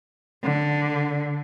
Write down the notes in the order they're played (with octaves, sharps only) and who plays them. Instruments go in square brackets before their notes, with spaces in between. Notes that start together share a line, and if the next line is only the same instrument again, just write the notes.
[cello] D3